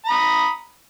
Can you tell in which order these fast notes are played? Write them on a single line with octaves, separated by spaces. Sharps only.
A#5 B5 D#6